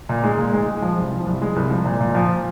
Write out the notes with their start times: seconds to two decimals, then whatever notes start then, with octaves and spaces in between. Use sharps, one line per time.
0.09 A#2
0.24 G#3
0.39 A#2
0.53 G#3
0.68 G#3
0.82 F3
0.98 C2
1.12 F3
1.26 C2
1.42 G#3
1.56 C2
1.70 F3
1.85 A#2
2.01 A#2
2.15 F3